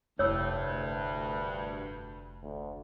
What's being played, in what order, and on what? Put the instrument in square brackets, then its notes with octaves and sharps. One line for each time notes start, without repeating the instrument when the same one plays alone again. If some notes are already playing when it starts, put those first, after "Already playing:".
[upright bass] F1 E4 [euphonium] D2 [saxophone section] G2 [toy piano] C#5 E6
[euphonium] D2